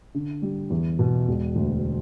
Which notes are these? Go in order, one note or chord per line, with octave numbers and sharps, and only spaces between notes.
D3
G3
E2
B2
E1
D2